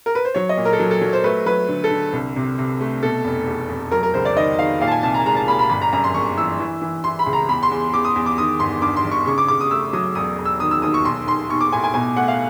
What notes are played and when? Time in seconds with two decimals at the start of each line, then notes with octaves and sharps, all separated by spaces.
0.06 A#4
0.15 B4
0.25 C5
0.35 F#3 C#5
0.49 D#5
0.57 A#2
0.65 A#4
0.73 A4
0.79 F#3
0.91 A4
1.01 F#3
1.13 C5
1.24 A3 B4
1.46 F#3 B4
1.69 D3
1.84 A4
1.91 D3
2.13 C2
2.36 C3
2.59 C3
2.81 A3
3.03 B2 A4
3.25 F1
3.47 E2
3.70 F1
3.91 F#3 A#4
4.03 A#4
4.14 C#2 C5
4.25 D5
4.36 D#3 D#5
4.59 D#3 F5
4.81 A#2 F5
4.88 A5
4.91 G#5
5.03 C2 A5
5.14 A#5
5.26 G#3 A#5
5.37 A5
5.48 A#2 B5
5.59 B5
5.69 G1 B5
5.82 A#5
5.93 F#2 A#5
6.04 C6
6.14 G1 C#6
6.38 E3 E6
6.59 E3
6.82 E3
7.04 E3 C6
7.19 B5
7.26 C#2
7.33 A#5
7.49 E2 B5
7.63 C6
7.71 E2
7.94 E2 D6
8.05 D#6
8.16 E2
8.26 D6
8.38 D#3 D#6
8.59 G1 C6
8.82 G2 D6
8.96 C6
9.04 G1
9.11 C#6
9.26 C#3 C#6
9.38 D6
9.48 C#3 D6
9.61 D#6
9.71 A3 E6
9.93 F#3 D#6
10.15 E1 D#6
10.38 E1
10.45 E6
10.60 D#3 D#6
10.71 E6
10.82 D#2 D#6
10.94 C#6
11.05 B1 C6
11.27 B1 C6
11.49 B1 C#6
11.61 D6
11.72 A2 G#5
11.84 G#5
11.94 B2 G#5
12.16 A3 F#5
12.28 F5